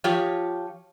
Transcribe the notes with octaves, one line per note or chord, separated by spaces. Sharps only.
F3 F4 G4 C#5